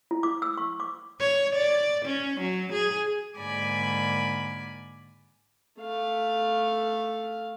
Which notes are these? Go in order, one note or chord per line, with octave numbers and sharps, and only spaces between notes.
E4
D6
E6
C#6
D6
C#5
D5
C#4
F#3
G#4
G#2 D3 A#3 D5 G#5 B5
A3 F5